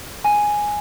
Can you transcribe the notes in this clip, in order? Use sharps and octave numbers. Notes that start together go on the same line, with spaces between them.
G#5